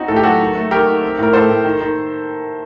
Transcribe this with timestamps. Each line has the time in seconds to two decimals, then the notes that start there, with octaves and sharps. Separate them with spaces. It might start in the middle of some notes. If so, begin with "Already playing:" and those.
Already playing: C4 D#4 F#4
0.08 A2 A4
0.16 G4
0.23 F#3 F#4 A4
0.40 D#3
0.55 A3
0.71 D#3 G4 A#4
0.87 D#3
1.02 C4
1.18 A2 A#4
1.33 A2 A4 C5
1.50 A2
1.65 D#3
1.80 D#3